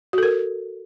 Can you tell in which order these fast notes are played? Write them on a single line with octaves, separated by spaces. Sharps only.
F#4 A4 A#4